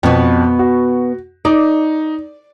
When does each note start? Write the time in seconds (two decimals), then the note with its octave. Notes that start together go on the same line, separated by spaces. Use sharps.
0.03 F2 B2 B3
0.59 F#4
1.45 D#4 D5